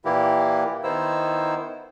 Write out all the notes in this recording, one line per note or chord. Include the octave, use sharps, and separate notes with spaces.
A#2 E3 A#3 E4 G4
D#3 B3 D#4 E4 C5 E6